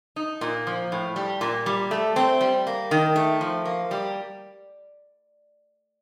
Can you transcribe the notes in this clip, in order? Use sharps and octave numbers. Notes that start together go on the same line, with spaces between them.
D#4
A#2
F3
A2
G3
A#2
G3
A3
C4
G3
A#3
D#3
A3
F3
A#3
G3